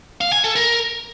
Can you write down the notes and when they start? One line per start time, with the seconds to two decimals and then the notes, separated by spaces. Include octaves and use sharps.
0.21 F5
0.32 G#5
0.44 A4
0.56 A#4